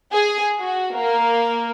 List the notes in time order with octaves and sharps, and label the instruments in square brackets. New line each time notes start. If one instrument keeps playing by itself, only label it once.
[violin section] G#4
F#4
A#3